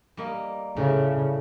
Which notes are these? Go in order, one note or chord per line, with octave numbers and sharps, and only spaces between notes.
G3 A#3 D#5
A2 C#3 G3 A3